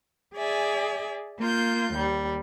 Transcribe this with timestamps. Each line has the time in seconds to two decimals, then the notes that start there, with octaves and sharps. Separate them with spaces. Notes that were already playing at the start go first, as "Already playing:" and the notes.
0.35 G#4 D5 E5 G#5
1.40 A#3 F4 G6
1.94 D#2 G3